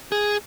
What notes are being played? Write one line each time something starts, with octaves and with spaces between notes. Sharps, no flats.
G#4